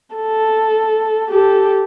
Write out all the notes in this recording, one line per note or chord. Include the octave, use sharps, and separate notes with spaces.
A4
G4 A4